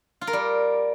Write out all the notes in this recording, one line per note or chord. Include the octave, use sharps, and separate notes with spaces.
F4
A#4
G3